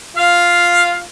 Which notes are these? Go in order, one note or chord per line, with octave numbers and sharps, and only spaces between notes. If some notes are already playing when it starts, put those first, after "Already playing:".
F4 F5